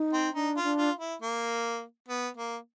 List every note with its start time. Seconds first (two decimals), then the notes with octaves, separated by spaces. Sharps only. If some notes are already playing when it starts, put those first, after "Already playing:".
Already playing: D#4
0.13 C4
0.34 D4 D#4
0.57 F4
0.63 D4
0.78 F4
0.99 E4
1.22 A#3
2.08 B3
2.37 A#3